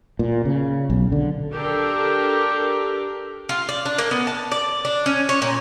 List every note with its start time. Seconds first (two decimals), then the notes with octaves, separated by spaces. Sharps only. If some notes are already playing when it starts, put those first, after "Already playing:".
0.19 A#2
0.45 C#3
0.90 B1
1.12 D3
1.53 D4 G4 A4 A#4
3.49 F4
3.69 D5
3.86 D4
3.98 A#3
4.11 B3
4.27 A5
4.52 D5
4.85 D4
5.06 C#4
5.29 C#5
5.42 A#2